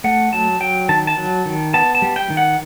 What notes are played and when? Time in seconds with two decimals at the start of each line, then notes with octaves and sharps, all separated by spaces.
0.04 A3 F#5
0.33 F#3 A5
0.60 F#3 G5
0.89 D#3 A5
1.07 A5
1.17 F#3
1.46 D#3
1.74 B3 A5
1.95 A5
2.02 G3
2.16 G5
2.30 D#3
2.37 F#5